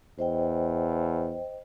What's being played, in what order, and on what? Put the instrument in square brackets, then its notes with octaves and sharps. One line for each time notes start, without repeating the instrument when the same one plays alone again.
[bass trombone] E2 [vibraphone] C5 D#5 G5